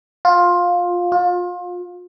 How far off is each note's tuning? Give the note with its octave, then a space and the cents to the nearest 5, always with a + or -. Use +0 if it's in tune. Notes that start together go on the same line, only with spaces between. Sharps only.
F4 +15
F4 +30